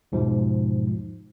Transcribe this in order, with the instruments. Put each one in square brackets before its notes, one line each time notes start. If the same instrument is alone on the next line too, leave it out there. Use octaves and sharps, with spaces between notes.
[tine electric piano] E2 G#2 B2 F3